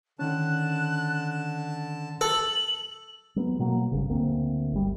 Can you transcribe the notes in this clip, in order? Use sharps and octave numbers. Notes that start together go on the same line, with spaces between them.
D3 D#3 C#4 A5 F#6
A4 F#7
F#3 B3
B2 F#3 A#3
G1 C#3
D2 A#3 C4
G1 G3